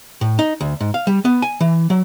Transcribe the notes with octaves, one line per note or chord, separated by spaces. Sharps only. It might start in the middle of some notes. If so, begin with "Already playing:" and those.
A2
D#4
D2
G#2
F5
G3
B3
G#5
E3
F#3